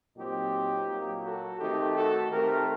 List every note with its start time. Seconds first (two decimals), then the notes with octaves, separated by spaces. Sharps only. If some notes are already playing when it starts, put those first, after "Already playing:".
0.17 A#2 F#3 C4 D#4 G4
0.88 A#2 F#3 A#3
1.24 F#4 A4
1.60 D#3 A3 C4 D#4 G4
1.95 F#4 A4
2.31 D#3 A3 C4 G4 A#4